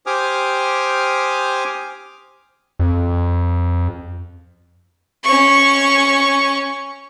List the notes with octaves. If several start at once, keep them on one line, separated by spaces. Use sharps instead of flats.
G4 C5 G#5 D6 D#6 F6
F2
C#4 C#6